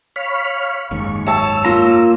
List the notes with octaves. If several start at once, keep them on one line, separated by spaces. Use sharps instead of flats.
C#5 F5 B5
F#1 D#2 G#2 C#6
C#5 A5 E6
A#3 F4 A#5